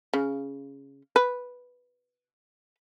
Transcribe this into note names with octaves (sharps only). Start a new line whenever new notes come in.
C#3
B4